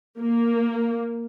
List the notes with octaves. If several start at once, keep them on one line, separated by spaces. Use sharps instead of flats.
A#3